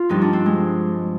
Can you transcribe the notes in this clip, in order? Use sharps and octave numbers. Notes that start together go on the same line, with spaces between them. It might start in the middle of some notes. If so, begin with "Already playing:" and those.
Already playing: F4
G2 F3 D#4
D4
C4
G#3